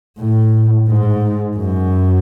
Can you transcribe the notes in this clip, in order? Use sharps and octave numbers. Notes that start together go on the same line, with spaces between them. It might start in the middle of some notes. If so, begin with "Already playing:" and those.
A2
G#2
F#2